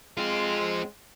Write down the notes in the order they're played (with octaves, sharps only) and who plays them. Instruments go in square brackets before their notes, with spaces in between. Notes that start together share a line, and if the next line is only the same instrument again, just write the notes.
[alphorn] G#3 [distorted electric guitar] C4 F4